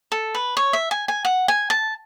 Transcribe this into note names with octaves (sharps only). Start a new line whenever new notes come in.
A4
B4
C#5
E5
G#5
G#5
F#5
G#5
A5